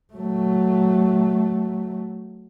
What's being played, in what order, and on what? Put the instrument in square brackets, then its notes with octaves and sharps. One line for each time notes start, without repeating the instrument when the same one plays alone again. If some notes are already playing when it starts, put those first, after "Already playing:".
[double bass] F#3 A3